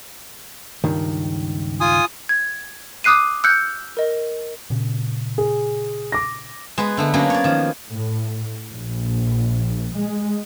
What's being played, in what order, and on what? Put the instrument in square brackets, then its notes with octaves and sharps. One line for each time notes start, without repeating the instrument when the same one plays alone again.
[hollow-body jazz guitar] C#2 G2 D#3
[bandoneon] F4 G#5 D#6
[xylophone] G#6
D6 D#6 F#6 C7 D#7
E6 F#6 G6 C#7
A#4 D#5
[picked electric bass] A#2 C#3
[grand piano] G#4
D6 A#6
[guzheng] G#3 B3 B4 F#5
D3 A3 B3
F#3 A#3 B3 C#4 D4
C#5 D5
D#3 F3
[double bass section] A2
A#1
G#3